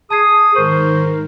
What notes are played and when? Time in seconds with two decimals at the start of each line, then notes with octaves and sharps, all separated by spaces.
0.10 G#4 A5 D#6 G#6 C7
0.56 G#2 D#3 A#4 C5 C#6